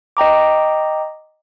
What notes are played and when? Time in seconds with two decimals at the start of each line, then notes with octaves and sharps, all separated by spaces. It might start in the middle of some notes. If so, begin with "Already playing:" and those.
0.17 D#5 G5 A#5 D6